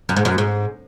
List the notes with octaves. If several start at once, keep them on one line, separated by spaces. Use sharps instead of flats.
F#2
G#2
F#2
G#2